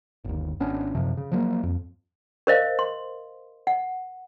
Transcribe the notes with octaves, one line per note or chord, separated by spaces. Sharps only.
G1 D#2
G#1 B3 C#4 D4
B1 F#2 C3 F3
C#3
F3 F#3 A#3
F2
A#4 C5 D#5 F5
C6
F#5